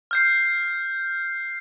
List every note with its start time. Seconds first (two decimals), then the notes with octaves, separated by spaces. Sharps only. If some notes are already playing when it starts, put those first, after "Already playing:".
0.11 F6 G6 C7